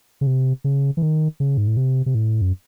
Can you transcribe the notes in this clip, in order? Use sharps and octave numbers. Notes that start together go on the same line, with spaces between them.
C#3
C3
C#3
E3
D#3
C#3
G#2
A2
C3
C3
A2
F#2